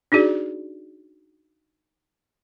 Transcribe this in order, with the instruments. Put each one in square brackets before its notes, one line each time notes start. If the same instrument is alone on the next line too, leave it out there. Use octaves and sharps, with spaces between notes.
[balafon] D4 D#4 F#4 G#4 D5